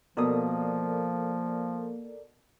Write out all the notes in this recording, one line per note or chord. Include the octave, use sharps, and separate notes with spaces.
B2 F3 A#3 A4 A#4 D5 D#6